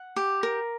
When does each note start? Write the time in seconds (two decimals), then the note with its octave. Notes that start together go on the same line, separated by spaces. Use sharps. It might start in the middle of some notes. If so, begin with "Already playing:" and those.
Already playing: F#5
0.16 G4
0.43 A#4